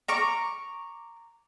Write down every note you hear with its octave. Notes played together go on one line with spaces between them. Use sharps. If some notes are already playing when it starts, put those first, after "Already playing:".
A#5 C#6 D6